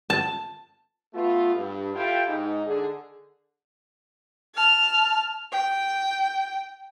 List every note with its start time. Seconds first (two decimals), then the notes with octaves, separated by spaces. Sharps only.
0.10 A5
1.14 A3 B3 F4
1.55 G2
1.94 E4 F4 G4 A4 F5 G5
2.28 G#2 D#4
2.66 D3 G#4
4.55 A5 F6
5.52 G5